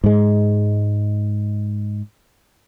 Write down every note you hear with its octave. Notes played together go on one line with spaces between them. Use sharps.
G#2 G#3